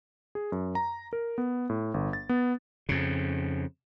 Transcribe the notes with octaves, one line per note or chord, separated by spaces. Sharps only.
G#4
F#2
A#5
A#4
B3
A2
G1
A6
B3
F2 C#3